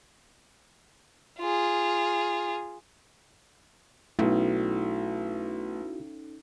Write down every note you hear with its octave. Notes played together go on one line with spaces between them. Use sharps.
F4 G#4
B1 A3 C#4 D#4 E4 F#4 A4